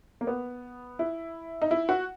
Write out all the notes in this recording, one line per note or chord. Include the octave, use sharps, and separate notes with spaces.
A#3
B3
E4
D#4
E4
F#4